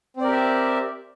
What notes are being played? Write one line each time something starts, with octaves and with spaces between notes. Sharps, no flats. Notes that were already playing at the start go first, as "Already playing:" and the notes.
C4 G4 A#4 D5 E5